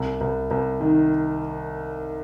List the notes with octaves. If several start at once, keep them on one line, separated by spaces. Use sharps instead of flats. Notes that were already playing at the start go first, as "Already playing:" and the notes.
Already playing: C2
C2
C2
D#3